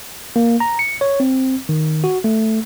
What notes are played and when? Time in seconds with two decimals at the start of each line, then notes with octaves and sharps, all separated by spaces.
0.36 A#3
0.60 A#5
0.79 C#7
1.01 C#5
1.20 C4
1.69 D#3
2.04 F#4
2.24 A3